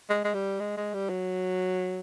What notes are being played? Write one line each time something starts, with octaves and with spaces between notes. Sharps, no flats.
G#3
G#3
G3
G#3
G#3
G3
F#3